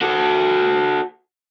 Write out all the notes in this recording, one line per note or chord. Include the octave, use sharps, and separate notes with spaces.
F#4 A4